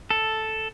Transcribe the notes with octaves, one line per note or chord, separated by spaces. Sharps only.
A4